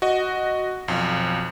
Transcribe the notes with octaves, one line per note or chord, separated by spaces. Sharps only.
F#4 D#5
B1 F2